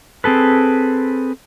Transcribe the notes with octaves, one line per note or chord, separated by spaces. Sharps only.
C4 G#4 A4 B4